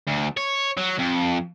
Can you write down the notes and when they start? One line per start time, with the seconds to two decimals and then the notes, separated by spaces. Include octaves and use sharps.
0.08 D2
0.37 C#5
0.77 F#3
0.98 F2